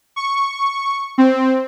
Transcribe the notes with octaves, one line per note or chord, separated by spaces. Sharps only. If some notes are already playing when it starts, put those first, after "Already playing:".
C#6
C4